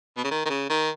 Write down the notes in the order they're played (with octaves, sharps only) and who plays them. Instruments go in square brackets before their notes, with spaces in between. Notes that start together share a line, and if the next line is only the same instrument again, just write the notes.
[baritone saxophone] B2
C#3
D#3
D#3
C#3
D#3